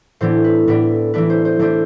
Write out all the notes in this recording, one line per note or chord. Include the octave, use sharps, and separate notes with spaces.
A2 E3 B3 D4 C5
B4
A2 E3 B3 D4 B4
E3 A3 D4 B4
C5
C5
E3 A3 D4 C5